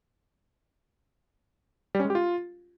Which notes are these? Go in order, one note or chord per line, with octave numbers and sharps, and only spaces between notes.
G3
C#4
G#3
G4
F4